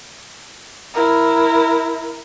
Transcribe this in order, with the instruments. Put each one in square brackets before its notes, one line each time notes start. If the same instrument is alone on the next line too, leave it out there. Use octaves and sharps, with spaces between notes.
[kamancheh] E4 A#4